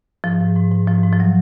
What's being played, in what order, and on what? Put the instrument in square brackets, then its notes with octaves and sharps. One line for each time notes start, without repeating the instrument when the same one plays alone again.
[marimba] G#2 F3
G#2
G#2
G#2
G#2 F3
G#2
F3
F#3